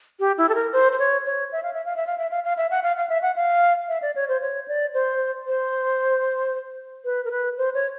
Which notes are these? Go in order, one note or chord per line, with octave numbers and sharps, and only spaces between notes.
G4
E4
A4
A#4
C5
C5
C#5
C#5
E5
F5
E5
F5
E5
F5
E5
F5
F5
E5
F#5
F5
F5
E5
F#5
F5
E5
D5
C#5
C5
C#5
D5
C5
C5
B4
A#4
B4
C5
C#5